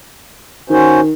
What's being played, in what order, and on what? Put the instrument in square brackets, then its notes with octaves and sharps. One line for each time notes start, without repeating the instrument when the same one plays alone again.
[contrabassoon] D#3 [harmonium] C#4 F#4 C5